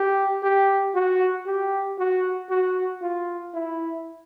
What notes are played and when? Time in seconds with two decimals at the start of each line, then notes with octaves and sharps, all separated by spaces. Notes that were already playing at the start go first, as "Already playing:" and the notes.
Already playing: G4
0.43 G4
0.95 F#4
1.46 G4
1.99 F#4
2.50 F#4
3.02 F4
3.54 E4